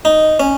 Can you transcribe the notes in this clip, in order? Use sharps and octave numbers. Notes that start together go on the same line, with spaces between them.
D#4
C#4